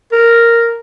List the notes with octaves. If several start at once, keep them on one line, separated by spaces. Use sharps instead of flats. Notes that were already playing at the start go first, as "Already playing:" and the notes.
A#4